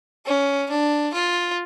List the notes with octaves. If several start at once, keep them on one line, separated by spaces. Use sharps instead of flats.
C#4
D4
F4